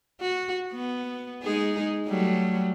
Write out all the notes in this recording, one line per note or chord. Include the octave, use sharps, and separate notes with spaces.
F#4
B3
G#3 D#4 G#4
F#3 G3 A3